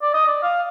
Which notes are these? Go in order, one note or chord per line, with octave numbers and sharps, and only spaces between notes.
D5
D#5
D5
F5